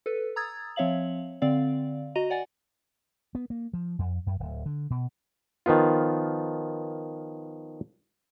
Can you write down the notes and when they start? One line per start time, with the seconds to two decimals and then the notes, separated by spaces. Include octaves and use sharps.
0.06 A4 B4
0.36 A#5 D#6 E6 G#6 A6
0.76 F3 C4 C#5 E5 F5 F#7
1.42 D3 C4 D5 F5
2.15 F#4 D#5 A#5 D#7 F7
2.30 D5 F#5 G#5 A6
3.35 B3
3.50 A#3
3.74 F3
3.99 F2
4.26 F#2
4.40 D1
4.66 D3
4.90 B2
5.66 D#3 F3 B3 F4